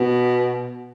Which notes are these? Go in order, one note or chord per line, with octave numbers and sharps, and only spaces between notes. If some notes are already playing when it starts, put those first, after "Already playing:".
Already playing: B2